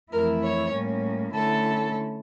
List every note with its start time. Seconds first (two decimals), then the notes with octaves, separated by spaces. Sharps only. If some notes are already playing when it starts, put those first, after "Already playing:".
0.12 F2 E3 A3 E4 A#4
0.43 C#5
0.73 A2 G3 A#3 C#4
1.34 D3 A3 C#4 E4 A4